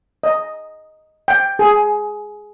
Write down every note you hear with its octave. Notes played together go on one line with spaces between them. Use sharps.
D#5
G5
G#4